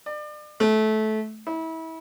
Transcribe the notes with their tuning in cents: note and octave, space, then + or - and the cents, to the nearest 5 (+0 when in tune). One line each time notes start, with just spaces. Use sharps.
D5 +35
A3 -20
E4 -30